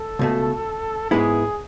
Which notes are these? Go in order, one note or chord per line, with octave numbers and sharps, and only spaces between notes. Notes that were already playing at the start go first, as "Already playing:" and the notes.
Already playing: A4
C#2 B2 A3
G#2 G#3 B3 E4 G#4